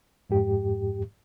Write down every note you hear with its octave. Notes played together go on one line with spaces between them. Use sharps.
F2 G#2 G4